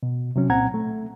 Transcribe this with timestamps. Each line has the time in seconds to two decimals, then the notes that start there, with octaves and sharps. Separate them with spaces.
0.03 B2
0.36 C3 F#3 C#4
0.50 C2 A#2 C4 F#5 A#5 G#6
0.74 A3